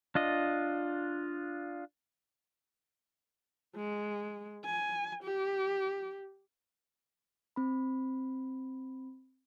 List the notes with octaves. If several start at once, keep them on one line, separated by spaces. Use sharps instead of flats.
D4 F4 D#5
G#3
G#5
G4
C4 B5